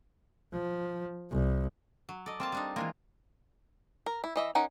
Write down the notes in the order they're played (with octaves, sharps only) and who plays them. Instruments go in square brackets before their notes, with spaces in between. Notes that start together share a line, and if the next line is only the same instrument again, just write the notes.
[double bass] F3
C2
[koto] F#3
[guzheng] A4 [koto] D5 D#5
[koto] A#3 F4 A5 [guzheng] C4
[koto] G3 D4 D#4
[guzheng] E3 G#3 A#3 [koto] F4
[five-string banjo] A#4
E4
E3 D#5 E5
C#4 D#4 A#4 F#5